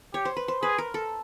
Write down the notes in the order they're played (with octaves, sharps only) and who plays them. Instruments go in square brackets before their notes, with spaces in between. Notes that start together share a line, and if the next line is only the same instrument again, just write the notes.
[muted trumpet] G4 [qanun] C#5
[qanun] C5
B4
C5
[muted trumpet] G#4 [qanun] B4
[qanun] A#4
A4